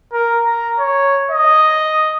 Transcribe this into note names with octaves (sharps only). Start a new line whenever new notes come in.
A#4
A#5
C#5
D#5